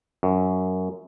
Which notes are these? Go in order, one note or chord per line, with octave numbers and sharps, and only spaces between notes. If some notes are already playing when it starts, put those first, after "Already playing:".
F#2